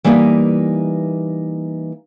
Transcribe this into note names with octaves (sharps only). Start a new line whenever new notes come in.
E3 G3 A#3 B3 D#4